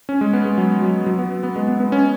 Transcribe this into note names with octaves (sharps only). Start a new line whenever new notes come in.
C#4
G#3
B3
G#3
F#3
F#3
F#3
B3
B3
G#3
B3
B3
C#4